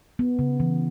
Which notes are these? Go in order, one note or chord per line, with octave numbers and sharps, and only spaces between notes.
B3
C#3
E3